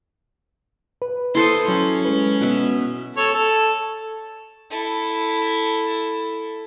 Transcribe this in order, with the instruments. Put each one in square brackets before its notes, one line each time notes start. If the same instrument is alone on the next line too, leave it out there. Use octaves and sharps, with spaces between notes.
[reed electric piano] B4
[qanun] E4 A4 C5 [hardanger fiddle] C6 D#6
[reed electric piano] F#3 [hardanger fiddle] C#4
[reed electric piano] G#3 B4
[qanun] B2 E5
[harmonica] A4 C#5
A4
[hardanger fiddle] E4 A4